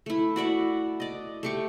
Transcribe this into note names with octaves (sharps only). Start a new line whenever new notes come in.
A3 E4
F#4 D5 E5 F#5
D5 D#5
A3 G4 C#6